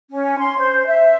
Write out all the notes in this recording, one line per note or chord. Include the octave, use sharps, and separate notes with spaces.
C#4
C6
C5
E5